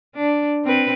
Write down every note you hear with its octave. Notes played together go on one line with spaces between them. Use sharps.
D4
C4 B4